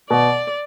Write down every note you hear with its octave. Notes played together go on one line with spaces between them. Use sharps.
B2 D5